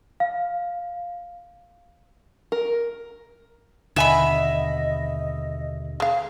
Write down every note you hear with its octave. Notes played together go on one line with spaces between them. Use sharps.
F5
A#4
D#2 B2 D3 B3 D#5 E5 G#5 B5
G#3 F5